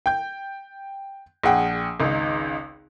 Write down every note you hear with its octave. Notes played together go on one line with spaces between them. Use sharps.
G5 G6
A#1 G#4 F#5 G5
G#1 C#2 D#4